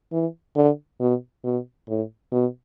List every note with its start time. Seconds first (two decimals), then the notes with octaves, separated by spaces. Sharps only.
0.12 E3
0.56 D3
1.00 B2
1.44 B2
1.88 A2
2.32 B2